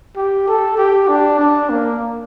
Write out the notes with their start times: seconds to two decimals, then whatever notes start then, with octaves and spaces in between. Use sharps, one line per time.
0.16 G4
0.48 A4
0.78 G4
1.08 D4
1.39 D4
1.70 A#3